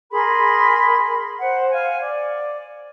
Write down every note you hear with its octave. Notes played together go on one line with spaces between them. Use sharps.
G#4 A#4 B5 C6
C5 F#5
F5 G#5
D5